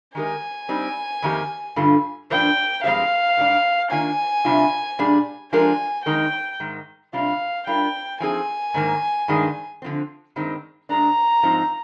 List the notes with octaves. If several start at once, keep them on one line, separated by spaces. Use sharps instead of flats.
D#3 G#3 D#4 G4 A#4 G#5
G3 C4 D#4
F2 D#3 A#3 D4 G4
G2 D3 G3 F4
G2 F3 A#3 D4 G5
G2 F3 G#3 C4 G4 F5
G#2 G3 D4
D#3 A#3 D4 F4 G#5
C3 G3 D4 F4
A#2 G3 D4 G#4
F3 G#3 D4 G4 A#4 G#5
F2 D#3 G#3 D#4 A#4 G5
G#2 D#3 G#3
C3 G3 D4 F4 F5
G3 D4 F4 A#4 G5
F3 C4 D#4 G#4 G#5
G#2 D#3 A#3
G2 D#3 G#3 D4 G#4
D3 F3 C4
G2 D#3 G#3 C4 D#4
A#2 G#3 D4 A#5
G#2 F3 C4 D#4